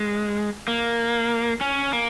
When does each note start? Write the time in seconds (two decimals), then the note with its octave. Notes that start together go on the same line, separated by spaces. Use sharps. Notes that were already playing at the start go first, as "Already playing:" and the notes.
Already playing: G#3
0.68 A#3
1.61 C#4
1.93 A#3